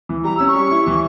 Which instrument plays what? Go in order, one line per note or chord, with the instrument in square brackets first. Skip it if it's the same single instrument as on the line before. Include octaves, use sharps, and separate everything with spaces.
[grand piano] E3
[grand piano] G3 [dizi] A#5
[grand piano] C#4 [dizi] E6
[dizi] C#6
[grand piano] G3
E4
E3